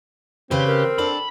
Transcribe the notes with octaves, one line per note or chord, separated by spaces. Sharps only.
C#3 C4 G4 B4
A#4
D4 A4 D5 B5